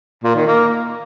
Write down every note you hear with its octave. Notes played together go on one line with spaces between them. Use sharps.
A#2
D#3
A#3